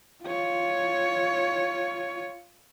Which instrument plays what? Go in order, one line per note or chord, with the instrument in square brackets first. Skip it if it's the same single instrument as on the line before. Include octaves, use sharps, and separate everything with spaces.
[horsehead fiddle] F4 C#5